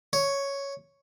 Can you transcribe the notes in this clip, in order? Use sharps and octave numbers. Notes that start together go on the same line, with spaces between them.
C#5